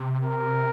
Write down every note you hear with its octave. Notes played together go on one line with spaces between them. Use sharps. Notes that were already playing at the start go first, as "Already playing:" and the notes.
Already playing: C3
A#4